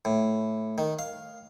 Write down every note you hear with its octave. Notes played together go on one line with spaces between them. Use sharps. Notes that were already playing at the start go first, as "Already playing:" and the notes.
A2
D#3
F5